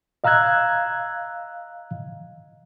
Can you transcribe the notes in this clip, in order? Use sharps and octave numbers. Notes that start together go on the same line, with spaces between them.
D#5 F5 A#5 E6 F#6 G#6